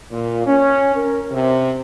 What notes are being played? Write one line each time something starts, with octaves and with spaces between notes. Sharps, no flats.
A#2
C#4
A#4
C3